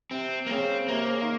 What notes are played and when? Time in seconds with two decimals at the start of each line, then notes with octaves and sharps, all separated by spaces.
0.11 C3 C4
0.46 A#3
0.50 C#3 C4
0.88 C3 A#3
1.04 C3
1.08 C#3
1.22 D#3